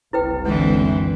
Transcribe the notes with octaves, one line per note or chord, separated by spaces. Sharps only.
F#1 C2 E4 B4 G5
D3 E3 G#3 C4